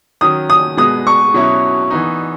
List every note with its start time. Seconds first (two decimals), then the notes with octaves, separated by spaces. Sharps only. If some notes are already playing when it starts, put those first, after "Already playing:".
0.21 D#3 F#3 C#4 D#6
0.50 D#6
0.77 B2 G#3 B3 D#6
1.07 C#6
1.34 B2 F#3 C#4 E4
1.90 E3 B3 D#4